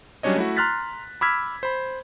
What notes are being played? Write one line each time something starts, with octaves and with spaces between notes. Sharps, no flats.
F#3 G3 C#4 D4 C#5 D#5
A3 E4 F#4
A#5 C6 F6 F#6 A6 B6
B5 D6 E6 F6 G#6 B6
C5 B5